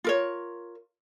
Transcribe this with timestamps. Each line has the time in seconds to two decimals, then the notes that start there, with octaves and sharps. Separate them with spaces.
0.04 F4 A#4 C#5